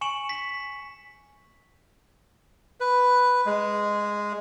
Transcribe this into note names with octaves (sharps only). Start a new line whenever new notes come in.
G#5 C#6 C#7 E7 F#7
B6
B4
G#3